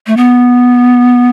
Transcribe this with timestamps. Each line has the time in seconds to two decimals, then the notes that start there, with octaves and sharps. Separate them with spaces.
0.07 A3
0.17 B3